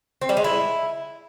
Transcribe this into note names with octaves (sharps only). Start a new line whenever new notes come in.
C4
G3
G#3
E4